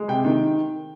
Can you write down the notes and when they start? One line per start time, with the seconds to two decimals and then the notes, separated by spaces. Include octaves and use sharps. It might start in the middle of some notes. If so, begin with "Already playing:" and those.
Already playing: G#3
0.08 C3 G5
0.25 D#3